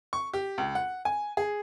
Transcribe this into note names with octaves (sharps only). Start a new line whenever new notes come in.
C#6
G4
C#2
F#5
G#5
G#4